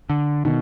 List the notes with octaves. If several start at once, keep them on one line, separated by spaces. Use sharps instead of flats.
D3
B2 D#3